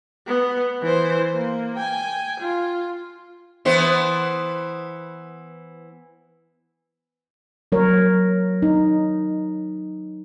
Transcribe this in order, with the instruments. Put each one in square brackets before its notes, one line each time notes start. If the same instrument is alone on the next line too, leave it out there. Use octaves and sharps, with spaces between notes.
[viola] B3
E3 C5
A#3
G5 G#5
F4
[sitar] E3 B3 C5
[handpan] F#3 A#4 C#5
D#4